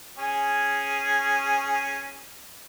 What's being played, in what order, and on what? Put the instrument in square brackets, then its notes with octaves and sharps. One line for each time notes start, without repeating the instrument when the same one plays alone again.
[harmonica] C#4 G#4